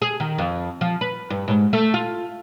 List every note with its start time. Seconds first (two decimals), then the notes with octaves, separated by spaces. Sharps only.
0.02 G#4
0.20 D#3
0.38 F2
0.81 F3
1.01 B4
1.30 G2
1.48 G#2
1.73 A3
1.94 F4